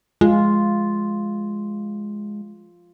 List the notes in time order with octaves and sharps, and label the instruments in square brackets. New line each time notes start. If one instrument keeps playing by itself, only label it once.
[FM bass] G#3 [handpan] F4